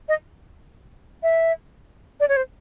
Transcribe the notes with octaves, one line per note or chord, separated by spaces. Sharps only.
D#5
E5
D5
C#5
C5